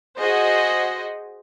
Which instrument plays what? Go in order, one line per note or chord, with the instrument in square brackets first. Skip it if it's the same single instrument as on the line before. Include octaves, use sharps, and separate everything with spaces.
[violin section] F#4 G#4 C5 D#5